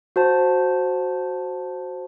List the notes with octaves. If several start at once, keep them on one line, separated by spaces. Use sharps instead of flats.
F#4 C5 A5